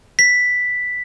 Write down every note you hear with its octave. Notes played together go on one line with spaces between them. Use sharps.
B6